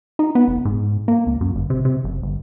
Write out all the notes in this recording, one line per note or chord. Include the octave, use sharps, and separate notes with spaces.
D#4
B3
F1
G#2
A#3
C#2
F#2
G1
C3
C3
F#1
G1